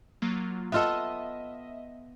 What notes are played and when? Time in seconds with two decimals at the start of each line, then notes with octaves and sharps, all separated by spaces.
0.22 F#3 A#3 F4
0.72 B3 F4 A4 D#5 E5